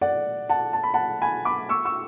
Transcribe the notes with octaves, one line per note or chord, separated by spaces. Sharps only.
D5 F#5
F#5 A5
A5
B5
F#5 A5
G#5 B5
B5 D6
C#6 E6
C#6 E6